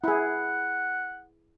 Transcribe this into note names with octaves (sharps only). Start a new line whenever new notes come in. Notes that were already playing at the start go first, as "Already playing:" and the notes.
E4 G#4 F#5